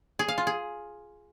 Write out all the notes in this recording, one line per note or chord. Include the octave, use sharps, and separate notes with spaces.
G#4
F5
F4
G#4